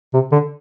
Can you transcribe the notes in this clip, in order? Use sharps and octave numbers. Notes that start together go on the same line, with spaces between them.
C3
D3